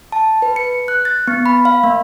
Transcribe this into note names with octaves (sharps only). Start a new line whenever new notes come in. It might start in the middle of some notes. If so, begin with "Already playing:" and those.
A5
B4
C#7
F#6
A6
B3
B5
F5
A#3